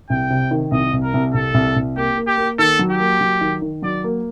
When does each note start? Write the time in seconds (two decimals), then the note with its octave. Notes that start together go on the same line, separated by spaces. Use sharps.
0.10 C2 G5
0.30 C3
0.51 D#3
0.71 C2 D#5
0.93 C2
1.03 A#4
1.14 C2
1.34 C2 A4
1.54 C2
1.76 C2
1.96 A#3 G4
2.18 A#3
2.27 G4
2.38 A#3
2.59 D#3 A4
2.79 F#3
2.90 G4
3.00 A#3
3.21 F#3
3.41 D#3
3.62 D#3
3.82 F#3 D5
4.04 A#3